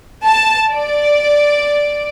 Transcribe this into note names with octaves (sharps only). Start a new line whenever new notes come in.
A5
D5